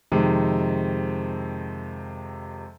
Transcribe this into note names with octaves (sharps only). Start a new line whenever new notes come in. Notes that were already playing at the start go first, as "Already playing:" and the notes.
F2 C3 D#3 G#3